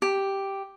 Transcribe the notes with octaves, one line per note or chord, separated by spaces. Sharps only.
G4